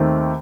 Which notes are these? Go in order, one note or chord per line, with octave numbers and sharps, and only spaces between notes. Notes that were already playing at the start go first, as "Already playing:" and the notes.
Already playing: D#2 D#3 A3 C4